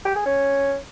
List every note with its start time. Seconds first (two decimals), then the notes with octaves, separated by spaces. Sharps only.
0.05 G4
0.16 G#4
0.26 C#4